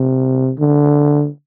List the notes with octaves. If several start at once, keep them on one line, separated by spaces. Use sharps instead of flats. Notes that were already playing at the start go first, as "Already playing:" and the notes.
Already playing: C3
D3